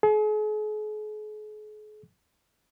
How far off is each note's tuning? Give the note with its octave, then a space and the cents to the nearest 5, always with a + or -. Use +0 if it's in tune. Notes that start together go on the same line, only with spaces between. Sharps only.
G#4 +45